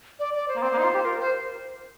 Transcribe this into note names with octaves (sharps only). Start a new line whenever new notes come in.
D5
D5
C5
A#3
C4 C5
A#3
D#4
F4
G4
F4 A#4
C5